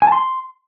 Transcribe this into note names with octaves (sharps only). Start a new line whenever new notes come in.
G#5
A5
C6